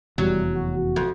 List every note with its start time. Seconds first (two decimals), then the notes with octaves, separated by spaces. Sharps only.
0.18 F1 E2 F#3 G3
0.54 F#4
0.96 F2